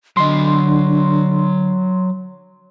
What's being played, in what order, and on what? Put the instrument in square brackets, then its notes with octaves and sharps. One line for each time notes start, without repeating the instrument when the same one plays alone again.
[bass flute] D3 [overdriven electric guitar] F#3 D#5 [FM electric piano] C6